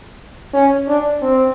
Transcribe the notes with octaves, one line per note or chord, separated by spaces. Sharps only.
C#4
D4
C4